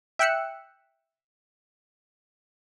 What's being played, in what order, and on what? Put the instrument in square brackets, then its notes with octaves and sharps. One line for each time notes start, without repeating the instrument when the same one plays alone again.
[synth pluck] E5 G5 E6 F#6 C#7